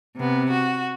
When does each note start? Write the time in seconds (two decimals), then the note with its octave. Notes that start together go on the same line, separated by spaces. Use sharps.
0.17 C3 B3
0.52 F#4